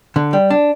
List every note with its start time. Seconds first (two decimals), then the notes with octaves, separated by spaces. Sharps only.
0.16 D3
0.33 G3
0.50 D4